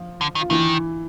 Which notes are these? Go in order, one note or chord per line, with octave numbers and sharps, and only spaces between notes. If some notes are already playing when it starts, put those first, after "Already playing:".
Already playing: F3 F4
D3
D#3
F4
D#3 E3 E4